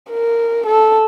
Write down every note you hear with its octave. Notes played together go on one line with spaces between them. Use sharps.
A#4
A4